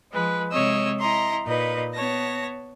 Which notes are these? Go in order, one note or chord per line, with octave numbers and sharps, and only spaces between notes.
F3 G#3 B4
C3 G#3 C#5 D#5 E6
E4 D#5 A#5 C6
A#2 D#4 B4 D#5
B3 C#5 A5 A#6